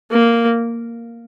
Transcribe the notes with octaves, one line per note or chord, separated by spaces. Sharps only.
A#3